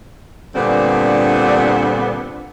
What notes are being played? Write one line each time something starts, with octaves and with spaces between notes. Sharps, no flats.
G2 A#2 D3 B3 C4 D4